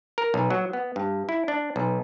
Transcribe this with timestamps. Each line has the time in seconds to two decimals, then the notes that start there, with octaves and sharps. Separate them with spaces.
0.18 A#4
0.34 B1
0.50 F#3
0.73 B3
0.96 G2
1.29 E4
1.48 D4
1.76 B1